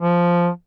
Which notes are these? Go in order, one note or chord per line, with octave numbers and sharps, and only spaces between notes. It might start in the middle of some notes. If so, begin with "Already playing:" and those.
F3